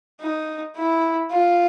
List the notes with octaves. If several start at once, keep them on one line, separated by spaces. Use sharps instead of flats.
D#4
E4
F4